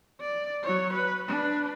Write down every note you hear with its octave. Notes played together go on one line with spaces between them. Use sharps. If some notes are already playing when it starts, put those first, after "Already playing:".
D5
F#3 C#5
B4
D4 B4